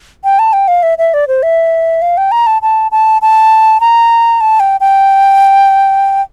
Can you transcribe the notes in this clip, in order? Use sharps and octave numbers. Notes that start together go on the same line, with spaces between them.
G5
A5
G5
F5
E5
E5
D5
C5
E5
F5
G5
A#5
A5
A5
A5
A5
A#5
A5
G5
G5